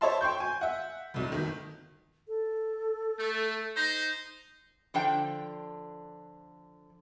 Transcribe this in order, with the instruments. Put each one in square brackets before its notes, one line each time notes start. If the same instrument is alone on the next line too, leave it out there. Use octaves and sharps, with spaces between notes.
[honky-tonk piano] C5 C#5 D#5 E5 A5 C6
G5 C6 C#6 G6
G#5
E5 F#5
F1 C2 F#3
G1 D#3
[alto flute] A4
[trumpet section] A3
D#4 C5 A#5
[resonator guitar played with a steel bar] D3 F3 D4 G5